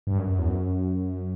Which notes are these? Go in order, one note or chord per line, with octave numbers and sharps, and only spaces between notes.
G2
F#2
F#2
E2
F#2